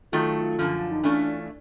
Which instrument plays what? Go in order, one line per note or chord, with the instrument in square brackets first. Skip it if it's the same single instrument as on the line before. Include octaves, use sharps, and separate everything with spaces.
[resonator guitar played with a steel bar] D#3 F#3 A3 [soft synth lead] F4
[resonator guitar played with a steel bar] F#2 D3 F3
[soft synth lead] D#4
[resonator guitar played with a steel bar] E3 A3 C#4 F4 [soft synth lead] D4